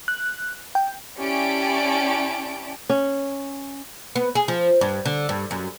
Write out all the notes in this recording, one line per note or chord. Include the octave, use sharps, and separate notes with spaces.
F#6
G5
C#4 E4 G4 D5 A5 D7
C#4
B3
G#4
F3
G2
D3
G2
F#2